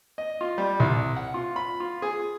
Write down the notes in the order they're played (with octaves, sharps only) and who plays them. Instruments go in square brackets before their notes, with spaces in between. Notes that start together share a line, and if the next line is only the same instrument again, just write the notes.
[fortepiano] D#5
F4
G3
C2
F#5
F4
B5
F4
G#4